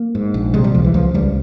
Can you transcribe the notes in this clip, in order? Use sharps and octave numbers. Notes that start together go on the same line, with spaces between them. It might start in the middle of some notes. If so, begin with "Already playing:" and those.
Already playing: A#3
G#2
A#1
C3 G#3
G3
C#2 F3
E3
C#2 F3
C#2 G3